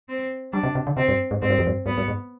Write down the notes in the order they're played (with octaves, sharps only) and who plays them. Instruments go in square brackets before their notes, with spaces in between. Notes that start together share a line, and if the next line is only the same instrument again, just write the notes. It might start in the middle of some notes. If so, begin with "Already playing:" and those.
[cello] C4
[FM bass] G3 [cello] D4
[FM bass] C3
C3
D3
[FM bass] C3 [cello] C4
[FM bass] G2
G#2
[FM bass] G#2 [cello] C4
[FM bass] G2
F2
G2
[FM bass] G2 [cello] B3
[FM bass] G2
G#2